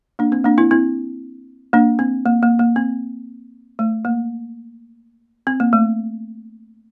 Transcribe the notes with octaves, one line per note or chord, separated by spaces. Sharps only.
A#3 D4
C4
A#3 D4
C4 E4
C4 E4
A#3 D4
C4
A#3
A#3
A#3
C4
A3
A#3
C4
A#3
A3